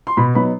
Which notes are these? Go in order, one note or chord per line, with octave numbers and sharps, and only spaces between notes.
C6
B2 B5
F#3 B3 D#4 B5